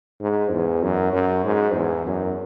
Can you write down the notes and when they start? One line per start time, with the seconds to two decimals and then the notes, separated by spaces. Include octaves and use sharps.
0.21 G#2
0.52 E2
0.83 F#2
1.13 F#2
1.44 G#2
1.75 E2
2.06 F#2